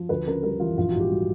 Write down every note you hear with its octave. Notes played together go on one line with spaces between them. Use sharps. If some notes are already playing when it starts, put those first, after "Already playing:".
Already playing: F3
D2 B4
C#3 A#4
G3 A#4
E3 F4
A#1 F4
F#4
G#2
G4
G3 F#4